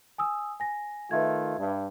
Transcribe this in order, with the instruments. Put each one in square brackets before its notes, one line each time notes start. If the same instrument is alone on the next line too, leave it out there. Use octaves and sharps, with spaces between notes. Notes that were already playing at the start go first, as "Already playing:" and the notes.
[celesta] G#5 D#6 E6
G#5 A#6
[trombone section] D#3 A3 F4 [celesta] B4 E5 G#6
[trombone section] G2